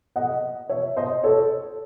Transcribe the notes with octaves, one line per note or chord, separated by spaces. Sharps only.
D#5 F#5
C#5 E5
C5 D#5
A4 C#5